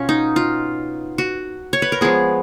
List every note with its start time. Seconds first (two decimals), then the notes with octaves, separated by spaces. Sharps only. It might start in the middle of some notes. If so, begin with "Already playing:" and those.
Already playing: B2 C#4 F4
0.09 D#4
0.36 F4
1.18 F#4
1.73 C#5
1.82 B4
1.92 A#4
2.01 F3 G#3 B3 G#4